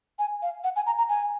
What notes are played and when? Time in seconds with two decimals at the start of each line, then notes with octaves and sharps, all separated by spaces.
0.19 G#5
0.42 F5
0.64 F#5
0.76 G#5
0.87 A#5
0.98 A#5
1.09 G#5